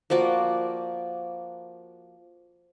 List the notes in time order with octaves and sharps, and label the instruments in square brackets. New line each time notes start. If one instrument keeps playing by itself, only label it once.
[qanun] F3 A#3 F#4 D5